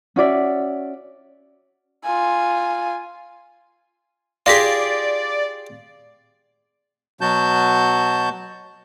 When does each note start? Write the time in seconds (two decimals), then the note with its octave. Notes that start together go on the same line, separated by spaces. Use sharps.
0.16 C#4 F#4 D5 E5
2.04 F4 G#5
4.46 F4 G4 G#4 D5 F5 A#6 B6
7.21 B2 F#3 F#4 A5 G6